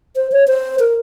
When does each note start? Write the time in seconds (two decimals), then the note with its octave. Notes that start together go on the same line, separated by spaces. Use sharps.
0.16 C5
0.32 C#5
0.48 C5
0.80 A#4